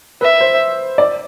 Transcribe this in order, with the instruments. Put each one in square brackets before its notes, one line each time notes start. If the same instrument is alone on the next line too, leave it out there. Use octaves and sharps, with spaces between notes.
[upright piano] B4 [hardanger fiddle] E5
[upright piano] C5
D5